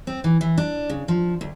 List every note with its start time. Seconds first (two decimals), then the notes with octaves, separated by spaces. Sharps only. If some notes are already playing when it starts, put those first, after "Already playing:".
0.07 C4
0.24 E3
0.41 E3
0.58 D4
0.90 C#3
1.08 F3
1.41 D2